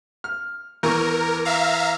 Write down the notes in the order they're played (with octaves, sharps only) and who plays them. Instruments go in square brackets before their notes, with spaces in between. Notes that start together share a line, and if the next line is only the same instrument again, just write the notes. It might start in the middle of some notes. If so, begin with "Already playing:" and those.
[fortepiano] F6
[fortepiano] E2 E3 C#6 [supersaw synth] A#4
[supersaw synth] E5 F5 A#5